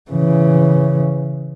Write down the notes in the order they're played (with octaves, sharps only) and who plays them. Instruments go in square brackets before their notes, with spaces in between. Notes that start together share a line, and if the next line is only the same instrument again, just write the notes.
[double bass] C#3 E3